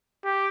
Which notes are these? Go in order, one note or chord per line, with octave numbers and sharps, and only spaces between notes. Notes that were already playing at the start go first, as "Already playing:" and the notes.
G4